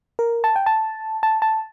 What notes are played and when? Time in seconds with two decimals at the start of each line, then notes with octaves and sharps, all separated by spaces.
0.19 A#4
0.44 A5
0.56 G5
0.66 A5
1.23 A5
1.42 A5